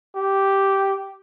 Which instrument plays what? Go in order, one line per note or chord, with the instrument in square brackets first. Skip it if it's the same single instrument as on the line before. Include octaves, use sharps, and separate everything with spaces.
[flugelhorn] G4